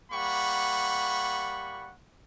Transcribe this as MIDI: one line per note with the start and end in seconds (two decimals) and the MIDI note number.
0.12 1.92 55
0.12 1.92 58
0.12 1.92 78
0.12 1.92 83
0.12 1.92 85